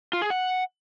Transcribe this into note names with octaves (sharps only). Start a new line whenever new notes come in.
F4
G#4
F#5